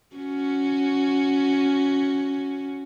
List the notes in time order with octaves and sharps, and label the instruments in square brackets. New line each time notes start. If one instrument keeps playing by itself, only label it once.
[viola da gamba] C#4 F#4